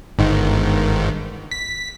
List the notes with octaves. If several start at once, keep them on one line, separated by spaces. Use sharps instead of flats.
G1 G#2 D#3
B6